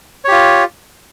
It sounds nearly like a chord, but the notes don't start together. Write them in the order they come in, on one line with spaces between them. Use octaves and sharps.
C#5 G4 F4